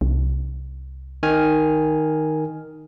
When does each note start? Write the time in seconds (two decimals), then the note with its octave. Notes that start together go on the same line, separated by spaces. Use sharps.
0.01 C2
1.23 D#3 G#5 F6